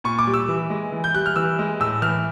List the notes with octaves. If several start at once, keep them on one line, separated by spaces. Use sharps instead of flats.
A#2 C#6
D6
G3
E6
E3
G#3
E3
G6
G3 F#6
F6
E3 E6
G#3
A2 E6
E3 F6